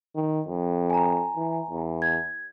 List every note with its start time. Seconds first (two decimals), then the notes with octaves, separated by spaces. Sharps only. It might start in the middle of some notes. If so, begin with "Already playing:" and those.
0.16 D#3
0.48 F2
0.90 G#5 A#5
1.37 E3
1.70 E2
2.02 G#6